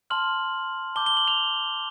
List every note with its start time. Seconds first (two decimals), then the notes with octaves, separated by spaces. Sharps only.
0.10 A5 C6 F6 F#7
0.96 A5 D6 G6 G7
1.06 G7
1.17 F#7
1.28 F7